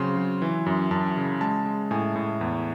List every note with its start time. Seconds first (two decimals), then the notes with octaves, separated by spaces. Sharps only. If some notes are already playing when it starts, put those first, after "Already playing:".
Already playing: C#3 F#3 C4 C6 C#6
0.17 F#3
0.42 E3
0.66 F#2
0.91 F#2 A5
1.17 C#3
1.41 G#3 A5
1.66 G#3
1.91 A2 G#5
2.16 A2
2.41 E2